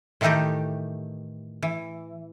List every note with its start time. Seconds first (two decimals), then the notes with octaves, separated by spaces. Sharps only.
0.21 A2 D#3 E3 A3 D#4 G4
1.63 E3